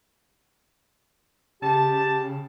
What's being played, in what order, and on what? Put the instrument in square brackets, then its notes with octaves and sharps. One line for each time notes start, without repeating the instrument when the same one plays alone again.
[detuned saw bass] C#3 [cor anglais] G4 [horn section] A5